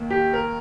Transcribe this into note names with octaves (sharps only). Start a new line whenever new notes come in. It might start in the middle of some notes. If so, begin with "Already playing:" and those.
Already playing: D#2 D#3 A#3
G4
A#4